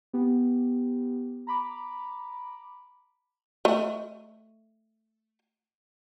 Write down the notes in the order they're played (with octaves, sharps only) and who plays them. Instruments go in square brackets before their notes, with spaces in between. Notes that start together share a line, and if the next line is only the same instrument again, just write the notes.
[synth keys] B3 G4
A#5 B5 D6
[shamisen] A3 D#5